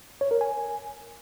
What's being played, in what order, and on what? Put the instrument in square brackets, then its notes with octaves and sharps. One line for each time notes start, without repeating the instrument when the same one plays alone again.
[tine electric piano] C#5
A#4
G#5